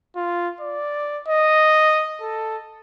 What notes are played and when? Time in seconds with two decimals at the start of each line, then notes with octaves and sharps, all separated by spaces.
0.16 F4
0.61 D5
1.28 D#5
2.21 A4